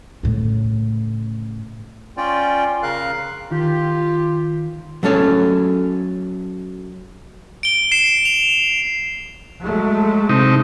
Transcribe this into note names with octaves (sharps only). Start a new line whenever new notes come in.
A2 C#3
C#4 F4 D5 G5
C#3 A#4 F5 F#6
D#3 F4 G4
F#3 A3 C#4 A4 C#5
D7 G7
C7 E7
F7
F#3 G#3 A3
C3 D#4